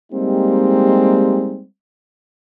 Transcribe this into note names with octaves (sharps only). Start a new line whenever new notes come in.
G3 G#3 A#3 C4 D#4 G4